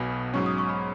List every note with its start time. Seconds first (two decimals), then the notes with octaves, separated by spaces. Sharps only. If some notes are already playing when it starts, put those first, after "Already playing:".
Already playing: B1 B2 B3 G#5 B5
0.34 G#2 F#3 C#4 C#6
0.46 D#6
0.58 C#6
0.69 B5